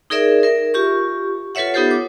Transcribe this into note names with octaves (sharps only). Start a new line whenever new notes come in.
D#4 G#4 A#4 D5 E5
A#4 E5
F4 G4 C#6
F4 A4 B4 C#5 E5 F#5
B3 D#4 F4 G4 A4 C5
D6